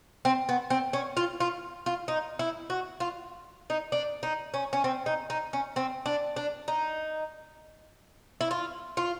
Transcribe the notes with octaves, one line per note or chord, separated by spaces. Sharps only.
C4
B3
C4
C#4
F4
F4
F4
D#4
E4
F#4
F4
D#4
D4
D#4
C#4
C#4
C4
D#4
D#4
C#4
C4
D4
D4
D#4
E4
F4
F4